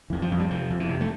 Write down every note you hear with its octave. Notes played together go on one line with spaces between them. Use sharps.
F2 E3
F3
F2
G3
C3 F3
F2
E3
C3
A3